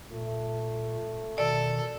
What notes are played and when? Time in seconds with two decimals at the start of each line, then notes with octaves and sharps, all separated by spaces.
0.12 A#2 A3
1.38 B2 D#3 A4 D5